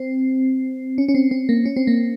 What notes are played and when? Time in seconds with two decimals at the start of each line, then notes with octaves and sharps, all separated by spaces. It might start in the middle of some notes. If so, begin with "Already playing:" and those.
Already playing: C4
0.98 C#4
1.08 C#4
1.15 C4
1.31 C4
1.49 A#3
1.65 C#4
1.76 C4
1.87 A#3